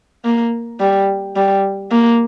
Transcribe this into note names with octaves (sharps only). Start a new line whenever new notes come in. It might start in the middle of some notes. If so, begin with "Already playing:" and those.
A#3
G3
G3
A#3